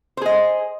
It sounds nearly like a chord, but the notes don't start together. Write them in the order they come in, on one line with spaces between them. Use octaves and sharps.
C5 G#4 D#5